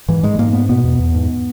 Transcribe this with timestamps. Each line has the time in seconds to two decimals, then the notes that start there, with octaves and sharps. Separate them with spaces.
0.08 G#2 E3
0.23 G#2 G#3
0.39 G#2 A#3
0.53 G#2 B3
0.69 B2 B3
0.84 E2
0.99 E2
1.15 G#2